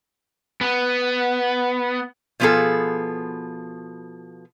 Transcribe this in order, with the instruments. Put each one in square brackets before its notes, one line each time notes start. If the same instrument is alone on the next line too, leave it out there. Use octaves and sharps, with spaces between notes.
[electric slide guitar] B3
[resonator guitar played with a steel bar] B2 F3 B3 F4 G#4 A4